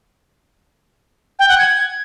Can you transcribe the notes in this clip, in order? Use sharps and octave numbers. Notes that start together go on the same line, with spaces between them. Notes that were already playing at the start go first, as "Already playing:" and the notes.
G5
F#5
G#6